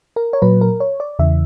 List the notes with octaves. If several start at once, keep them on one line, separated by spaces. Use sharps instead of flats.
A#4
C#5
A#2 F#3 B4
A#4
C#5
D5
E2 C#3 E3 E5